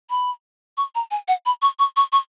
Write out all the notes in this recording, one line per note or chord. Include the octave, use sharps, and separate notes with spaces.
B5
C#6
A#5
G#5
F#5
B5
C#6
C#6
C#6
C#6